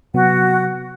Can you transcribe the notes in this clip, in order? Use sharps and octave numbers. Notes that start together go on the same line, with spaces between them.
C3 F#3 B3 F#4 F#5